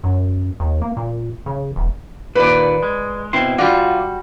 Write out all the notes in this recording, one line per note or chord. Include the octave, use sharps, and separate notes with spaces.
F#2
D#2
A#3
A#2
C#3
E1
D#2 A#2 B4 D5
G#3
B2 C4 E4 C6
G3 F4 F#4 D5